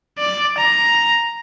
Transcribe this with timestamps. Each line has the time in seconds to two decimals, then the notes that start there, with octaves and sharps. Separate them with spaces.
0.19 D5
0.57 A#5